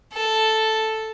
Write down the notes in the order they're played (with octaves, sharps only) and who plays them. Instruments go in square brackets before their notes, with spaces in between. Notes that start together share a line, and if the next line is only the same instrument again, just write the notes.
[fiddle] A4